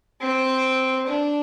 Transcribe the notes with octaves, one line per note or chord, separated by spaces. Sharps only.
C4
D4